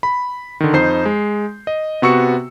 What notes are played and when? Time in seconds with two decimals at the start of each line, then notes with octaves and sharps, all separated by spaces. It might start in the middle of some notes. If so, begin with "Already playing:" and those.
0.03 B5
0.60 D3 D#3
0.73 F2 D#4 C5 G6 C7
1.05 G#3
1.67 D#5
2.02 C3 B3 F#4 C#6 E6 C#7